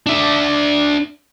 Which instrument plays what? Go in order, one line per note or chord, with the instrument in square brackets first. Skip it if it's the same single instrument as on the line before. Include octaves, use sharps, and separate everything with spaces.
[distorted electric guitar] D4 E5